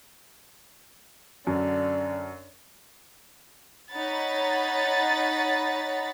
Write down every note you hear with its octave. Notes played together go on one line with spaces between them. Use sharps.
F#2 D3
D#4 C#5 F#5 B5 A6